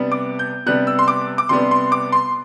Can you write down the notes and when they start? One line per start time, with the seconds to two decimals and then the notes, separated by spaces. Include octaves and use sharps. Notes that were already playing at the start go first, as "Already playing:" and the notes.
Already playing: C3 G3 B3 D4
0.12 D6
0.39 G6
0.66 C3 G3 B3 D4 F#6
0.87 E6
0.99 C6
1.08 D6
1.38 D6
1.49 C3 G3 B3 D4 C6
1.71 C6
1.92 D6
2.12 C6